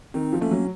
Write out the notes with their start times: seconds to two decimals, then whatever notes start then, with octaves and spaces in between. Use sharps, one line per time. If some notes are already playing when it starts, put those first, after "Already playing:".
0.14 D#3 C4 D#4
0.33 F3
0.41 A3 A#3 C#4
0.51 F#3